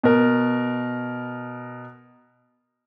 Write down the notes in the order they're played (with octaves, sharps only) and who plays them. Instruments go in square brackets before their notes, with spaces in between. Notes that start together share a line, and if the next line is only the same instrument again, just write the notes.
[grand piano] B2 A#4